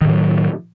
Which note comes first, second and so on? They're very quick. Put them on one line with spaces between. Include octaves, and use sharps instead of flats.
D#3 A2 E3 F#3